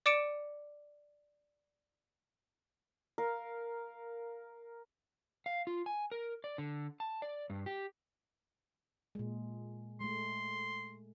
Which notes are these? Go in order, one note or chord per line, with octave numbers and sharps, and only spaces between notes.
D5 D6 C#7 D7 E7
A#4 F5
F5
F4
G#5
A#4
D5
D3
A5
D5
G2
G4
A#2 G#3
G#3 A3 C6